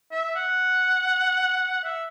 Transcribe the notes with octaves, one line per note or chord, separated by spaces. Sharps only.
E5
F#5
E5